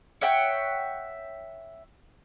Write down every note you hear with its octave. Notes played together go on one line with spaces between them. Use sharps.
C#5 E5 F#5 G5